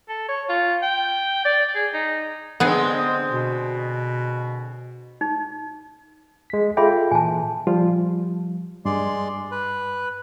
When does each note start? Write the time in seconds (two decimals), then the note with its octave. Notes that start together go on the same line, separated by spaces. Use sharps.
0.09 A4
0.29 C#5
0.49 F4
0.82 G5
1.45 D5
1.75 G#4
1.93 D#4
2.60 D3 G#3 B3 C4 G#4
3.30 B2
5.21 D#4
6.50 G#3 B6
6.77 F4 G#4 A4 E5 G5 B5
7.11 A#2 E3 G#5 A5
7.67 F3 G3 F4
8.85 G2 G#3 D5 C6
9.51 B4